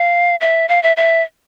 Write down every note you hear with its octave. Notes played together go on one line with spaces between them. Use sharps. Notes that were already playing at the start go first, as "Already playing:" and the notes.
Already playing: F5
E5
F5
E5
E5